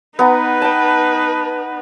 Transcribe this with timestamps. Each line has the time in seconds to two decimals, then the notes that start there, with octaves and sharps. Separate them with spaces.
0.19 B3 D#4 B4 A#5
0.62 G5 A5